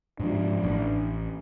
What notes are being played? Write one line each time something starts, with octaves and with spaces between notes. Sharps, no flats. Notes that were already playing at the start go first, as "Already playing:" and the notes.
G#2 F3 D4
A1